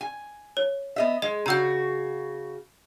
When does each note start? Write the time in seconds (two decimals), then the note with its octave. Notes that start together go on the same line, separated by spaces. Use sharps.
0.01 G#5
0.57 C#5
0.96 B3 D#5 E5
1.22 G#3 D#5
1.46 C#3 F#4 A#5 E6 G6